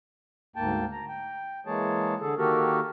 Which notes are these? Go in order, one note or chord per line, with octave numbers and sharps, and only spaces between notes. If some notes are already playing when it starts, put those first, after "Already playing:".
D2 G#2 A#3 G5 A5
A#5
G5
E3 G#3 A#3 G#4 C#5 A5
D3 G#4 A4
D#3 A#3 F#4 G4 A4 A#4